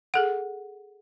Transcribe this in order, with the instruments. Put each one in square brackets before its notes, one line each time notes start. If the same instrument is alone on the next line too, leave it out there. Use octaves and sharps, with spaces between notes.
[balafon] G#4 A4 F#5